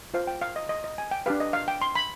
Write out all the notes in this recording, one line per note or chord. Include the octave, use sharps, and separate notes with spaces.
F4 C5 F5
G5
F5
D#5
D#5
D#5
G#5
G5
D4 G4 B4 F5
D#5
F5
G5
C6
B5